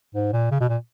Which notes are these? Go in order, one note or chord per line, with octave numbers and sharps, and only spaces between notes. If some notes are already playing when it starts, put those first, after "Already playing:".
G#2
A#2
C#3
B2
A#2